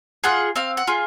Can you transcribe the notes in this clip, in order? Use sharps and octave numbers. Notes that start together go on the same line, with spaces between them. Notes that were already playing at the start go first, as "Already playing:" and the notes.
F4 G#4 F#5
C4 F5
F#5
F4 G#4